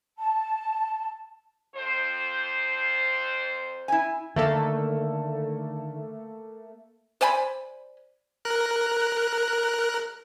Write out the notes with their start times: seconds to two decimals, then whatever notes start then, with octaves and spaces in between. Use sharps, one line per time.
0.18 A5
1.75 F2 C5
3.88 E4 G#5
4.36 D3 D#3 A3 A#3 A4
7.21 C5 D5 G#5 B5
8.45 A#4 F#6